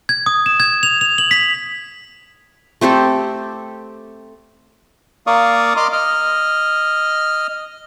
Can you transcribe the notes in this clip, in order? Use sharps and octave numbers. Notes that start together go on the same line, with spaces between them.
G#6
D#6
E7
G#6
F7
F7
F#7
B6
A3 C4 G4 A4
A#3 D5 F5 C#6 D#6
D#5 C6 D6 F6
D#5 F6